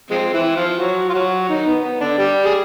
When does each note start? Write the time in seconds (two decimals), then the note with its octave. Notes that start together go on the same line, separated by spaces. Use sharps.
0.10 F3 G#3 C4
0.33 E3 E4
0.56 F3 F4
0.79 F#3 F#4
1.09 F4
1.14 F#3 F#4
1.48 D#3 D#4
1.66 B3
1.84 B3
2.00 D3 D4
2.18 G3 G4
2.45 G#4